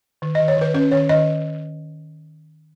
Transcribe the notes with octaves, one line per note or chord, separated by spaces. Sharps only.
D#3
D#5
D#3
C#5
D#3 B4
C#4 B4
D#3 C#5
D#3 D#5